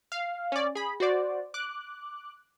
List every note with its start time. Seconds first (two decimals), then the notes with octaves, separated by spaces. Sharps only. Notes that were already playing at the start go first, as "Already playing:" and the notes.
0.12 F5
0.52 C#4 D5
0.75 G#4 B5
1.00 F#4 C5 D5
1.54 D6 F#6